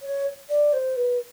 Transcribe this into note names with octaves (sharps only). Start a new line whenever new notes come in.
C#5
D5
C5
B4